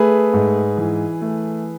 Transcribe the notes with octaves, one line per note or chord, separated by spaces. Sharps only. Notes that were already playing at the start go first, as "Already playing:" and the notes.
Already playing: A3 G#4 B4
G#2
E3
A3